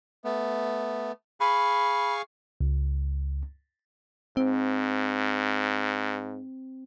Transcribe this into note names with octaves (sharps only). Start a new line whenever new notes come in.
A3 B3
G#4 F5 B5 C#6
C#2
G#2 C4